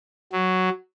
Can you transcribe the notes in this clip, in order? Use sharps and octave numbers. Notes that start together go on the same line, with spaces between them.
F#3